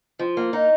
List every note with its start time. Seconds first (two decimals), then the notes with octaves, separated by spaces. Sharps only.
0.19 F3
0.37 A#3
0.53 D#4